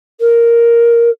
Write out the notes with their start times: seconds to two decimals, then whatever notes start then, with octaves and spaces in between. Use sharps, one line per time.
0.20 A#4